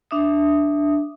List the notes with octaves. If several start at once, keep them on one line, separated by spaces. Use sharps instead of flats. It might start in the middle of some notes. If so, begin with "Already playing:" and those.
D4 E5 D#6